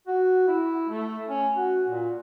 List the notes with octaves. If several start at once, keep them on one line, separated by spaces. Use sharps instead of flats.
F#4
E4
A3
C#4
F#4
A#2